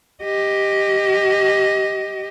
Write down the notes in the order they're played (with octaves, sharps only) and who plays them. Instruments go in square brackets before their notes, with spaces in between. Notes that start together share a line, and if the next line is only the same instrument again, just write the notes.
[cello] G4 D#5